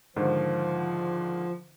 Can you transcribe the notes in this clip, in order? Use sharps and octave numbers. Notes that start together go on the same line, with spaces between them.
G#2 D3 D#3 F3